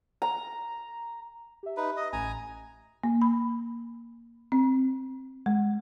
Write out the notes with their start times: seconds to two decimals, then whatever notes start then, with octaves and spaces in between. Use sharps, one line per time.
0.22 A#5
1.63 G4 E5
1.77 D#4 B4
1.97 D#5
2.13 A1 G#5 A#5
3.04 A#3
3.22 B5
4.52 C4
5.46 G#3